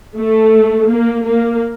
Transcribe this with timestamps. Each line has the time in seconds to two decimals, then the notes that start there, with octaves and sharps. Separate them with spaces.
0.16 A3
0.89 A#3
1.25 A#3